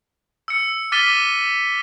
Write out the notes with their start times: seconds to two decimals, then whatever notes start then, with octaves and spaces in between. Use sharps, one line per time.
0.48 E6 C#7
0.92 D6 F6 A6 B6 D#7 G7